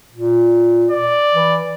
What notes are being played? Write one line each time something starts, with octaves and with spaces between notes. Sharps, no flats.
A#2
D5
E3